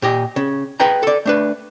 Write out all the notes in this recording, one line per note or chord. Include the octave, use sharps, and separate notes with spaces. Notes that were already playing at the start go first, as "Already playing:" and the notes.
A#2 G4 D#5
C#3
G#4 B4 D#5 G5 A#5
A4 D5
A3 D4 B4